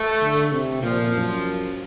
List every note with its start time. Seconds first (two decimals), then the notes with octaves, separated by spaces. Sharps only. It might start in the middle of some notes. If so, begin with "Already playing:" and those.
Already playing: A3
0.22 D3
0.52 C3
0.83 A#2 F3
1.14 F#2